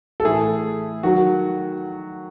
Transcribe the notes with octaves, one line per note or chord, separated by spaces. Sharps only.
A4
A2 E3 A3 E4 G#4
D#3 F#3 F#4